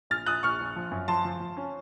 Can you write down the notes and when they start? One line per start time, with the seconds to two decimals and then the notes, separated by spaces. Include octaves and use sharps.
0.10 A#1 F6 A6
0.26 A#1 D#6 F#6
0.43 A#1 C#6 F6
0.60 A#1
0.76 F3
0.91 F#2
1.08 F3 A5 C6
1.25 F3
1.40 F3
1.57 C#4